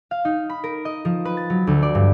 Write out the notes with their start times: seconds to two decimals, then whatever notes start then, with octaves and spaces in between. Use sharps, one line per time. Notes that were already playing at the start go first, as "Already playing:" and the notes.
0.11 F5
0.25 D#4
0.49 B5
0.64 A#4
0.85 D#5
1.05 F3
1.25 B4
1.37 A6
1.50 F#3
1.67 D2
1.83 D5
1.95 G2